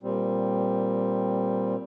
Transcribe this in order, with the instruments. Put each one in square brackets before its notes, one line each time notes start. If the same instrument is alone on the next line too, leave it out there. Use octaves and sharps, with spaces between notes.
[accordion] A#2 G3 C4